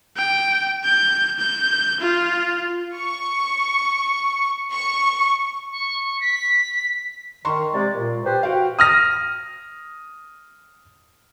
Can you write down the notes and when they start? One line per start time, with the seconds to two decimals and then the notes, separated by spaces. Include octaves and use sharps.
0.17 G5
0.85 G6
1.39 G6
2.01 F4
2.96 C#6
4.73 C#6
5.71 C#6
6.21 B6
7.45 D#3 A#5 C6 C#6
7.73 C3 G#3 D5
7.94 A#2
8.24 G4 B4 C5
8.43 F#4 F5 G5
8.79 D#6 F6 A#6